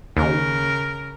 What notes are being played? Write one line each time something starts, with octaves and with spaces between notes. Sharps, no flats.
D#2 C#3 A#4